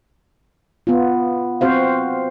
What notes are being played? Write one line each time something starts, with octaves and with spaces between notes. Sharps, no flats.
B3 F4
C4 F#4 C5 F5